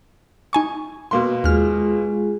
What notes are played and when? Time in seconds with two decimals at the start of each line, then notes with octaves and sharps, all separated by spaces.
0.53 D#4 G#5 C#6
1.11 B2 A#3 C6
1.44 D#2 G#3 F4 G#4 F6